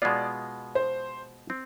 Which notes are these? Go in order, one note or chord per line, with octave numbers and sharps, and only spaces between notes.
B2 G#3 B3 F4 D5
C5
C4